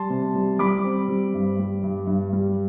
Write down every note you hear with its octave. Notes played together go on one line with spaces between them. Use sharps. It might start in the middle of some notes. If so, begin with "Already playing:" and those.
Already playing: G3 A5 C6
C3
G3
G3 B5 D6
C4
G3
G2
G3
G2
G2
G3